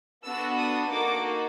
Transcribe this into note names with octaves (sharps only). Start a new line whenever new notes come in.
B3 D4 F#4 A4 E6
D#6
A#3 D#4 F#4 A4 D6